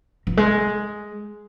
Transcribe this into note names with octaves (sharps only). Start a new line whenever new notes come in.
F3
G#3